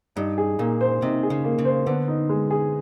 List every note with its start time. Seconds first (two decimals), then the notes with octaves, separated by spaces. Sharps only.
0.16 G2 D#4
0.38 G#4
0.59 A#2 A#3
0.81 C5
1.02 C3 D#4
1.23 G#4
1.30 C#3
1.44 A#3
1.58 C#3
1.65 C5
1.86 D3 B3
2.08 D#4
2.29 G#3
2.50 G#4